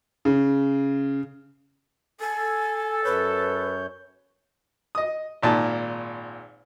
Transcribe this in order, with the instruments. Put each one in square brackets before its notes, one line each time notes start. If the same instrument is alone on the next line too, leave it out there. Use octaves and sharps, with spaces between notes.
[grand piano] C#3
[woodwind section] A4 [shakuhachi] G#5
[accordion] F#2 C#5 G6 [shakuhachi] B4
[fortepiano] D#5 D#6
G#1 A#2 A5